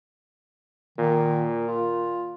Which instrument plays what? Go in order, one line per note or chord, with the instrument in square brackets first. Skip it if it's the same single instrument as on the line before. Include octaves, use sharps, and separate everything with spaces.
[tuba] A#2 [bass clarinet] D#3
[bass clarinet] F4